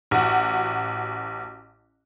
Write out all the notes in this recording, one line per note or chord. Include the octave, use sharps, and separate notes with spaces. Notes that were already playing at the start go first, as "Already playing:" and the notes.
A1 F#4